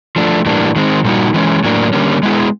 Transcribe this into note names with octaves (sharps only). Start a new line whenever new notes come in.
F3 A3 D4
A2 E3 G3 A#3 D4
D#3 G#3 C4
A#2 G3 A#3 D#4 F#4
E3 G#3 C#4
A2 F#3 A#3 D4
D3 G3 A#3 C#4
G#3 B3 E4 G#4